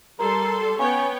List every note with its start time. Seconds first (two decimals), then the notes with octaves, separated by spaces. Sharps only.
0.19 G3 A4 A#4 C6
0.79 B3 C#4 C#5 G5